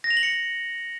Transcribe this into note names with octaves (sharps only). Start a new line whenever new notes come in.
A#6
F7
F#7
C#7